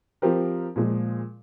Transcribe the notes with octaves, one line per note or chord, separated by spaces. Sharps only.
F3 C4 G4 A#4
A#2 F3 G#3